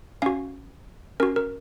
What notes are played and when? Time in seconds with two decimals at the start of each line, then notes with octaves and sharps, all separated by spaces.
0.22 C#4 F#4 F5 G#5
1.20 C#4 F#4 A#4
1.36 A#4